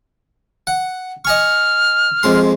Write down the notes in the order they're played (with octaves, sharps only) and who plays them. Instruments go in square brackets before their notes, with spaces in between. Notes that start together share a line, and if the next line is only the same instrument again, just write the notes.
[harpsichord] F#5
[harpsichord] D#5 G#5 C#6 [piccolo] F6
[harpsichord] F2 G#3 C6